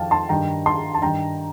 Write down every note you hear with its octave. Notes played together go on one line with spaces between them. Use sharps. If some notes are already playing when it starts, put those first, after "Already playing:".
Already playing: F2 D#3 F5 G5 A5
A5 C6
G2 D#3 G5 A#5
A5 C6
A5
G2 D#3 G5 A#5